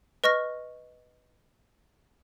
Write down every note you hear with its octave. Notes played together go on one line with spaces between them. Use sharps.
B4 D#5 C#6 F6 A#6